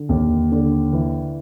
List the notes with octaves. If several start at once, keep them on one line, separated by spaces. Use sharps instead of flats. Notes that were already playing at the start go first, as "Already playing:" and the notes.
Already playing: D3
D#2
D3
E3